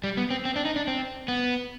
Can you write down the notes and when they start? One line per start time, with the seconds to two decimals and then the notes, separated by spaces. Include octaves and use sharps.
0.04 G3
0.17 B3
0.30 C4
0.45 C4
0.56 D4
0.65 D#4
0.76 D4
0.88 C4
1.28 B3